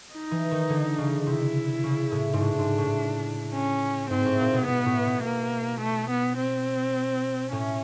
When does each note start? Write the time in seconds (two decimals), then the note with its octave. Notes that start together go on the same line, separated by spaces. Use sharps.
0.13 D#4
0.31 E3
0.51 D#3
0.69 D3
0.98 C#3
1.26 C3 E4
1.83 C#3
2.11 A2
2.33 G#2
2.40 A2 D4
2.59 G#2
2.78 A2
3.54 C#4
4.10 G#2 C4
4.25 A2
4.39 A#2
4.53 B2
4.67 B2 B3
4.86 A2
5.06 B2
5.24 A#3
5.81 A3
6.10 B3
6.38 C4
7.52 A2 C#4